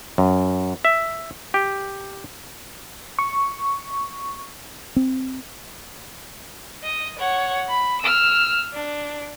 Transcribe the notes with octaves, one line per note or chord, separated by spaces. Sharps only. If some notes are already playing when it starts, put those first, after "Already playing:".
F#2
E5
G4
C#6
C4
D#5
C#5 F#5
B5
E6 F6
D4